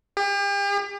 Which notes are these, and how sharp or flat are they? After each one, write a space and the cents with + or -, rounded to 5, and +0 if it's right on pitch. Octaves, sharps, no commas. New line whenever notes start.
G4 +40